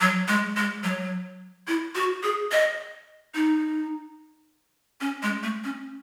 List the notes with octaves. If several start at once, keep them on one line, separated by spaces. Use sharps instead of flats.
F#3
G#3
G#3
F#3
E4
F#4
G#4
D#5
D#4
C#4
G#3
A3
C#4